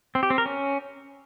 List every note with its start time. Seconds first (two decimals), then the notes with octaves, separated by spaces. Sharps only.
0.15 C4
0.23 G4
0.30 C4
0.38 A#4
0.46 C#4